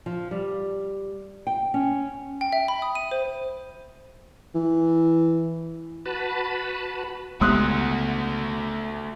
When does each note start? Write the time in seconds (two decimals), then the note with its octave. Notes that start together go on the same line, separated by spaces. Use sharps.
0.06 F3
0.31 G3
1.47 G5
1.74 C#4
2.41 G5
2.52 E5
2.68 B5
2.82 D#6
2.95 D#7
3.11 C5
4.55 E3
6.06 F#4 B4 A5 B5
7.41 C#2 G#3 A3 B3 F#4 C6 D#6 F#6